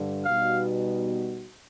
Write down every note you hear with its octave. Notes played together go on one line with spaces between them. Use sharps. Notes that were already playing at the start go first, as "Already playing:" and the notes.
Already playing: G2 D3
B2 G3 B3 D#4 F#4 F5